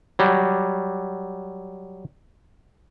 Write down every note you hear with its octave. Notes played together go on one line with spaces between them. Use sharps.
F#3 G3